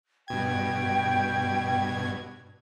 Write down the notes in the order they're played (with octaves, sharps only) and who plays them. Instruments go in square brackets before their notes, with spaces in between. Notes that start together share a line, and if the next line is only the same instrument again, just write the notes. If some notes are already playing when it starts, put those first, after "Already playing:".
[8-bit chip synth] G2 B2 G#6 [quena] G5